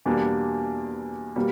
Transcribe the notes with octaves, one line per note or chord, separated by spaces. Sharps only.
E2 B2 G3 A#3 D4
B2 G3 A#3